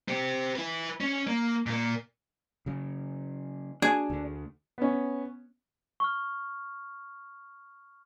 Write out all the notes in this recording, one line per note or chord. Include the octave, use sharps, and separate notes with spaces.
C4 G4
E4 B4
C#4
A#3
A#2 A#3
C#3 F#3
D4 F#4 G#4
D2 D3
B3 C#4
C#6 F6